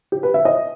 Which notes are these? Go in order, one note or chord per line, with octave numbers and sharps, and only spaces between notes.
G4
B4
E5
D#5